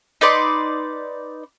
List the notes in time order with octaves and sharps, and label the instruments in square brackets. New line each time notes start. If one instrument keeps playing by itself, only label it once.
[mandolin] D#4 B4 D5 C6